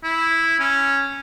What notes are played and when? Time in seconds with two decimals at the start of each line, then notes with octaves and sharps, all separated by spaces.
0.04 E4
0.60 C#4